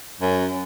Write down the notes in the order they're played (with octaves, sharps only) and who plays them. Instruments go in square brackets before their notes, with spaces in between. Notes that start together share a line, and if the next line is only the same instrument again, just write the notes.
[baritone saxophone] F#2